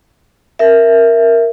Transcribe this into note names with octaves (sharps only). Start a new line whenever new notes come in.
A#4 E5